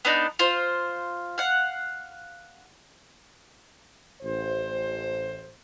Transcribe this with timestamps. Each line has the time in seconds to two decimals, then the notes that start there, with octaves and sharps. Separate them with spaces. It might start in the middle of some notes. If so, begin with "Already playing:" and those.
0.05 B3 D4 D#4
0.39 F4 C5
1.38 F5 F#5
4.22 A1 C5